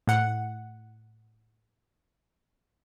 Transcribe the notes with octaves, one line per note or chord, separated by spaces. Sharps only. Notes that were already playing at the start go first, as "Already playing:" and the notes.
A2 F#5